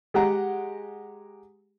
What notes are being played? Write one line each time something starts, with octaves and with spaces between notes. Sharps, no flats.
G#3 G4 F#5 A#5